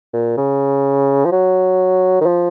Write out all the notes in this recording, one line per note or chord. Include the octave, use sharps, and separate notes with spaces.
A#2
C#3
F3
F#3
D#3
F3